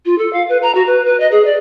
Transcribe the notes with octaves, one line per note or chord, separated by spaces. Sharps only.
F4
A4
F5
B4
A#5
F#4
B4
B4
D#5
G#4
D5